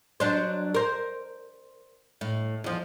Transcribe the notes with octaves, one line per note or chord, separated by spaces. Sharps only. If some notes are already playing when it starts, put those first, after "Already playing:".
F#3 D4 C5
A#4 C5
A2
E2 F3